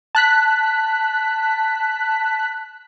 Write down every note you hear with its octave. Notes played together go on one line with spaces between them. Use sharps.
A5 F#6 B6